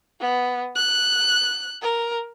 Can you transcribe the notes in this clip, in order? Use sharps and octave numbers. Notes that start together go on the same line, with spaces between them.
B3
F#6
A#4